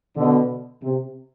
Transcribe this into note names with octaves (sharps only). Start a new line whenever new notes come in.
B2 D3
C3